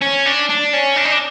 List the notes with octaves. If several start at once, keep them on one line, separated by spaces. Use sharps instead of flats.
C#4
D4
D4
C#4
D4
D#4
D4